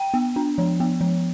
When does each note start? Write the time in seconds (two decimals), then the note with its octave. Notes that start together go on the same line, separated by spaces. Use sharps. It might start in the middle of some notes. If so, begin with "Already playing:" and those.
Already playing: G5
0.14 B3
0.36 D4
0.58 F3
0.80 B3
1.01 F3